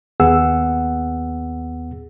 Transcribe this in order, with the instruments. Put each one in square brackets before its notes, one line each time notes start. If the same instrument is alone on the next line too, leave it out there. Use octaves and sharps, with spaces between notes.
[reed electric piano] D#2 B3 G#4 F#5 E6